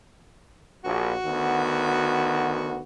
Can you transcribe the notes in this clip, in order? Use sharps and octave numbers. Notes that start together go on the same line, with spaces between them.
A#1 F#4
D2 D#3 B3